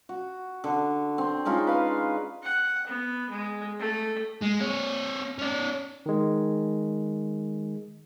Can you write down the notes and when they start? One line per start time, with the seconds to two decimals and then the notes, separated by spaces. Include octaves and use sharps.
0.09 F#4
0.64 D3
1.18 C4
1.45 G#3 C#4 D#4 F4
1.67 B4 F5
2.43 F#5
2.87 B3
3.29 G#3
3.79 A3
4.41 G#3
4.60 C4 C#5
5.38 C#4 D5
6.06 D#3 G#3